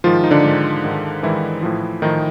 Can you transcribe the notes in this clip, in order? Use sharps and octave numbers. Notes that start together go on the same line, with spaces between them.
G#2 D#3 F3 F4
D#4
D3 D4
G#2 D#3
G#2 D#3
G#2 D#3 E3 E4
A2 F3
A2 D#3 F3 D#4